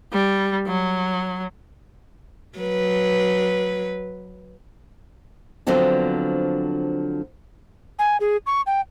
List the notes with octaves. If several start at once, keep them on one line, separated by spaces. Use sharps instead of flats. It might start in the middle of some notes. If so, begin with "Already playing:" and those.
G3
F#3
F#3 B4
D3 F3 F#3 B3 C4 D4
G#5
G#4
C#6
G5